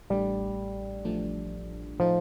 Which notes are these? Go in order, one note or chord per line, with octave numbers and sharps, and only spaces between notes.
A1 A2 G3 A3 D4
A1 A2 F3 A3 D4
A2 F3 A3 D#4